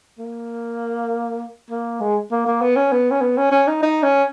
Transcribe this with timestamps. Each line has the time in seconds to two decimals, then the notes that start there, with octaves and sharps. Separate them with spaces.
0.19 A#3
1.70 A#3
2.00 G#3
2.31 A#3
2.47 A#3
2.62 B3
2.76 C#4
2.92 B3
3.11 C#4
3.21 B3
3.38 C#4
3.52 C#4
3.68 D#4
3.83 D#4
4.03 C#4